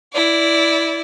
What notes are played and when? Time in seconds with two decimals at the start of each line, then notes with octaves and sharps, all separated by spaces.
0.13 E4 D5